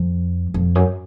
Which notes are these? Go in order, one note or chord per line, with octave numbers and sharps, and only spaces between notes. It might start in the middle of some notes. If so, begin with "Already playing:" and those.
Already playing: F2
F2
F#2